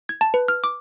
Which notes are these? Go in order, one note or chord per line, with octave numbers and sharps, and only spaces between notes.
G#6
A5
B4
F6
D6